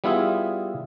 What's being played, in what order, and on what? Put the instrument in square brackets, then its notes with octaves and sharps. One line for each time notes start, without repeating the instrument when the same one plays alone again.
[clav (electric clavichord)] G3 B3 E4 F4 G#4 E5